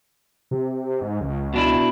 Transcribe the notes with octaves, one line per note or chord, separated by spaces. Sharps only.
C3
G#2
C#2
B2 D4 E4